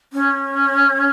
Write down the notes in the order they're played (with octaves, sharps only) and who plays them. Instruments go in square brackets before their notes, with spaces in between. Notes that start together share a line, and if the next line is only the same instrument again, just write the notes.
[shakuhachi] C#4